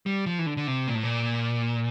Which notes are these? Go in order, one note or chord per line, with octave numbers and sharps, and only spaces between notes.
G3
F3
E3
D3
D3
C3
A#2
A2
A#2